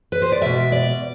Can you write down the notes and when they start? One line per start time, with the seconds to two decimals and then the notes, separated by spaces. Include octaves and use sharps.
0.12 B4
0.22 C5
0.32 D5
0.41 B2 G#3 E5
0.72 D5